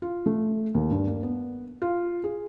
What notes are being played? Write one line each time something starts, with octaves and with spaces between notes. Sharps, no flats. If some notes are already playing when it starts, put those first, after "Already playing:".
F4
A3
D#2
G2
A#3
B3
F4
G#4